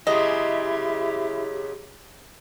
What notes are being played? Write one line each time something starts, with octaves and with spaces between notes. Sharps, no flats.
C#3 F#3 G#3 E4 G4 D#5